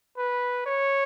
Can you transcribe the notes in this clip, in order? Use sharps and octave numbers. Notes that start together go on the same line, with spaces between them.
B4
C#5